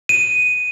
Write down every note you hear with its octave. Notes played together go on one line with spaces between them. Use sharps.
D#7